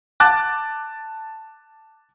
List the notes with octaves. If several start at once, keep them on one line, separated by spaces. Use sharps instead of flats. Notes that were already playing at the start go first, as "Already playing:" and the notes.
A5 D6 F#6 A6